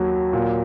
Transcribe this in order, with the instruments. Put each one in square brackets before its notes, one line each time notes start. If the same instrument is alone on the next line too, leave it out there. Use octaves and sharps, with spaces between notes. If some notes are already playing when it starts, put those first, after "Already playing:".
Already playing: [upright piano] D#2 F#3
A#2